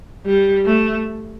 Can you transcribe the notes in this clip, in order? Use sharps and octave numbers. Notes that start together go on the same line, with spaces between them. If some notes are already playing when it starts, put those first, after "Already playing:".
G3
A3